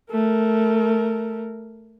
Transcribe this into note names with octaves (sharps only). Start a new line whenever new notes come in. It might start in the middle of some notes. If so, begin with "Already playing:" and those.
A3 A#4